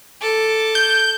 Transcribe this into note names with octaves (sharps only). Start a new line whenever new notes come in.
A4 D6
G6